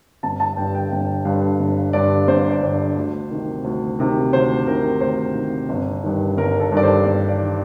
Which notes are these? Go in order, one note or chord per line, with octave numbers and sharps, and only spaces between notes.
G1 A5
A5
G2 D3 G5
G5
G1 G5
G2 D3 F5
G1
G2 D3 D5
G1 C5
D5
G2 D3 C5
D2
C3 D#3
D2
C3 D#3
D2 C5
C3 D#3 A#4
D2 C5
C3 D#3
G1
G2 D#3
G1 A#4
A4
G2 D#3 D5
C5
G1 D5
D5
D#3